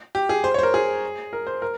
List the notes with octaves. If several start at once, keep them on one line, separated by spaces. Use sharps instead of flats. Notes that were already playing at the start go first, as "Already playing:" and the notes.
G4
G#4
C5
C#5
C5
A#4
G#4
A#4
C5
A#4